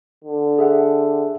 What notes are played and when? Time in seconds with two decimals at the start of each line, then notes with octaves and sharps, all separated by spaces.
0.24 D3
0.59 G#4 E5 F#5